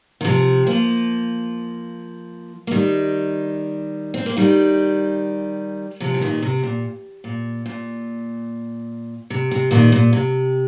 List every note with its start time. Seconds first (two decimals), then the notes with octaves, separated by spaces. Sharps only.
0.21 D#3
0.25 C3 F3
0.67 F3 A#3
2.67 A#3
2.71 D#3 G3
4.14 C4
4.26 A#3
4.37 D#3 G3
6.00 C3 F3
6.14 F3
6.21 A#2 D#3
6.42 C3
6.63 A#2
7.24 A#2
7.66 A#2
9.30 C3
9.51 C3
9.71 A#2 D#3
9.92 A#2
10.13 C3